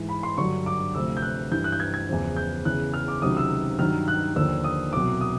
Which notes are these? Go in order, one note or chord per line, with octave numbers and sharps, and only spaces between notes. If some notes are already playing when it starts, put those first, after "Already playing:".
Already playing: G#2 E3
B5
C6
G2 D3 F#3 C#6
D6
D2 C3 F3 E6
G6
F#6
G2 E3 G6
F#6
G6
G#6
G#6
E2 C#3 F3
G6
E2 C#3 E3 F#6
F6
D6
C#2 C3 D#3 F#3 D#6
E6
G2 D#3 F#3 F6
F#6
D#2 D3 F3 E6
D#6
C2 B2 F#3 D6
D#6